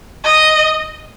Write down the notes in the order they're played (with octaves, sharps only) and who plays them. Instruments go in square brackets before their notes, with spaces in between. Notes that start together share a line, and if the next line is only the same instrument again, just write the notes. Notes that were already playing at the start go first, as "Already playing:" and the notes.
[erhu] D#5